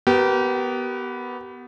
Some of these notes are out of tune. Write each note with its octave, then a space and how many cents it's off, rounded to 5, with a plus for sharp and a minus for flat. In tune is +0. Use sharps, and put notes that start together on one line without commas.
B3 +0 G4 -30 A#4 -5